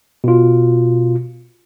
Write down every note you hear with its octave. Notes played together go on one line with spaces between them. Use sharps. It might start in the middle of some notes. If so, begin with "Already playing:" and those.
B2 F4